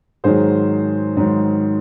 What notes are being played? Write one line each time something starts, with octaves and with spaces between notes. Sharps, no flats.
G#2 D#3 F#3 G#4 C5
G#2 D#3 F#3